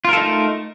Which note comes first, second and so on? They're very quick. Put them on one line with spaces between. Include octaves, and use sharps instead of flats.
F4 A#4 A4 D#4 A3